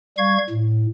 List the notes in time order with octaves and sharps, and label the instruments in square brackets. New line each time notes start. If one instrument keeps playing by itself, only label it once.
[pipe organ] G3 F5 C#6 G#6
A2